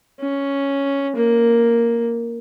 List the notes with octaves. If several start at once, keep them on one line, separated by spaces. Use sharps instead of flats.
C#4
A#3